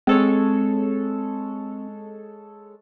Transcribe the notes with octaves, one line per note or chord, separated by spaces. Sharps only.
G#3 C4 A4 C#5